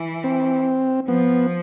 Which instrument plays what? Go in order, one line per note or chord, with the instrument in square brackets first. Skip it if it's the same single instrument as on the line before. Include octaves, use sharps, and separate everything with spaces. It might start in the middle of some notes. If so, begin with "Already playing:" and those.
Already playing: [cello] E3
[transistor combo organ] C4
[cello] F3 [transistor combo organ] B3